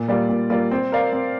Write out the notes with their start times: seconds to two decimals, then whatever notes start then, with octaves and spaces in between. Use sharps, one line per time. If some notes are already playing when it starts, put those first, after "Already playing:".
Already playing: A#2
0.08 G3 A#3 F4 D5
0.29 A#2
0.50 G3 A#3 F4 D5
0.71 C4
0.92 A#4 D5 F5
1.13 C4